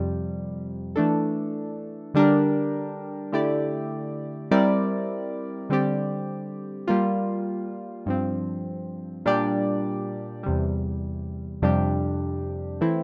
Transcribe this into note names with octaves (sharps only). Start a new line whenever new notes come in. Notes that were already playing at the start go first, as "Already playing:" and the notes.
Already playing: F2 C3 G3
E3 A3 D4 A4
D3 G3 D4 G4 A#4
D3 A3 E4 G4 D5
G3 C4 E4 A#4 D5
D3 G3 C4 G4 D5
G3 A#3 F4
G2 F3 C4
A#2 G3 D4 G4 D5
E2 C3 G3
F2 C3 G3 D4 G4
E3 A3 C4 E4